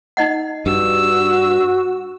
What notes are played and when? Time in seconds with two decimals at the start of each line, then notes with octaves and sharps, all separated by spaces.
0.17 D#4 D#5 F#5
0.66 G2 F#4 E6